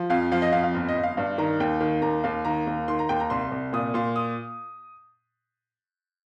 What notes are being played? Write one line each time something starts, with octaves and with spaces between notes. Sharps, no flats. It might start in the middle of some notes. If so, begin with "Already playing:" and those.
Already playing: F3
F2 F5
F3 F5
D#5
F2 F5
F5
G1
D#5
G1
F5
G2 F5
D#3 A#5
D#2 G5
D#3
D#2 A#5
D#2 F5
D#3 A#5
D#2
D#3 C6
A#5
D#2 G5
A#5
C2 C6
C2
A#2 D#6
A#2 C6
D#6